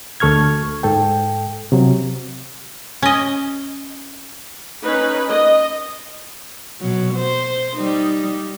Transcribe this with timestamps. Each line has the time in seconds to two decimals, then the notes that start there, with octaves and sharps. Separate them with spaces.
0.20 D2 A4 C#6 F6 G#6
0.83 G#2 A4 G5
1.72 C3 F#3
3.02 C#4 D#5
4.83 C#4 D#4 B4
5.28 D#5
6.81 B2 F#3
7.15 C5
7.76 G3 D#4